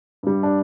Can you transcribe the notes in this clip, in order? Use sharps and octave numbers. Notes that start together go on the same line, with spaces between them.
G2 G3
D4